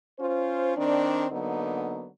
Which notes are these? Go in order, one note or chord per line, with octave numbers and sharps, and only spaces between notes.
C#4 F4 C5
D#3 C4 D4
D3 F#3 A#3 B3 D#4